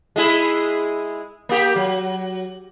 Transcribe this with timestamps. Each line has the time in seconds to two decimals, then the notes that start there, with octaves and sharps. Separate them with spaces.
0.16 G#3 E4 G#4
1.49 A#3 G4
1.76 F#3